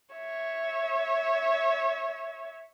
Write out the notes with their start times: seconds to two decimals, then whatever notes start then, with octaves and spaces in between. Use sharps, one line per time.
0.15 C#5 E5